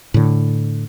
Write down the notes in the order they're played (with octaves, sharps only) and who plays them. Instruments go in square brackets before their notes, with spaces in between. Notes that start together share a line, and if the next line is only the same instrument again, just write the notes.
[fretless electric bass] A2 D3